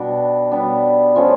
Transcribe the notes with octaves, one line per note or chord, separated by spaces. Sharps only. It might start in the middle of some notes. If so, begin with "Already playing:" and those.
Already playing: B2 G3 B3 D4
B2 G3 B3 D4
F3 A3 C#4 F4